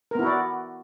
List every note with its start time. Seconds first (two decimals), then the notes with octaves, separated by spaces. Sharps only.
0.11 A#4
0.15 B3
0.19 E4
0.23 F#4
0.27 D5